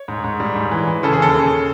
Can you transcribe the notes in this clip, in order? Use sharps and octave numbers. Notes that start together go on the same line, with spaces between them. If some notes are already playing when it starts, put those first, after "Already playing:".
Already playing: C#5
G#2
G#2
G3
G#2
E3
E3
C#3 A4
G#4
D#2 A4
C#3